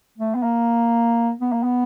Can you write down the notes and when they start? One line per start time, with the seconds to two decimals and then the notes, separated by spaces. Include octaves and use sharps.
0.18 A3
0.35 B3
0.43 A#3
1.41 B3
1.52 A#3
1.63 B3